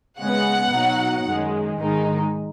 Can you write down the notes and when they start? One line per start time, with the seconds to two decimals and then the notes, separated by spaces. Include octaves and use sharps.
0.19 C#3 G#3 B3 F#5
0.72 B2 F#3 D#4
1.24 F#2 D#3 G#3
1.77 G#2 D#3 G#3 D#4